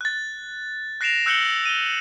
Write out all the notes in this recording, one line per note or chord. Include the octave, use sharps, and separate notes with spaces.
F#6 A6
F#6 A#6 C7 D7 E7 F7
E6 F#6 G6 C#7 F#7 G7
D#7 G7